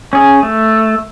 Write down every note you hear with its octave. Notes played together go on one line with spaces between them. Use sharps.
C#4 G#4
A3